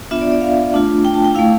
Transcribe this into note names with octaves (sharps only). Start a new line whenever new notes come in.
B3 D4 F4 E5
D5
D5
F5
A3 D4 F4
G5
A5
G5
A3 E4 F5